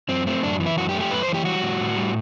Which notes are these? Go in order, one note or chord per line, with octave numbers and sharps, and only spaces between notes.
F#2 C4
A3 C4
F#2 D4
E3
E4
F#2 F#4
G4
A3
G4
F#2 B4
C5
E3
G4
G3 F#4
A2
A2
G3